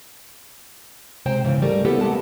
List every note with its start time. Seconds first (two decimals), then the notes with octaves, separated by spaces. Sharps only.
1.26 C3 G#3 C5 G5 A#5
1.45 E2 G#2 C#3 E3
1.62 G3 A3 A#4 D5
1.85 B3 C#4 E4 G4 A4
2.01 G#3 A#3 F#5 A5